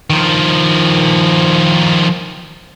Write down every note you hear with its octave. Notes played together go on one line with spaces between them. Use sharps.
D#3 F3